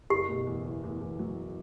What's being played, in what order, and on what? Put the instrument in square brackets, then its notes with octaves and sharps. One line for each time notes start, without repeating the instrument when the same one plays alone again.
[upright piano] F#1 [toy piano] G4
[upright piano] B2
E2
F#1
E2
E2
F#3